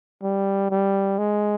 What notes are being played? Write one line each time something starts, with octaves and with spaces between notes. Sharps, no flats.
G3
G3
G#3